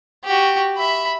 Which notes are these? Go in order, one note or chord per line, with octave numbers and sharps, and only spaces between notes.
F#4 G4
E5 B5